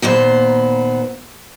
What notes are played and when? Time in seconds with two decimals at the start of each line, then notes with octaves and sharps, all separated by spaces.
0.02 D#2 A#2 B3 C5